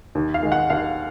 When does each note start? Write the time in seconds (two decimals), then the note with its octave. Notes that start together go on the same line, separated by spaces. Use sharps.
0.15 D#2
0.34 F5
0.43 D#3 G#3
0.52 F#5
0.70 D#2 F5